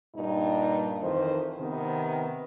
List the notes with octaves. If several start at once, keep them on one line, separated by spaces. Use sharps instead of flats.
G2 A#2 D#4
F2 D#3 E3 C5
C3 D#3 B3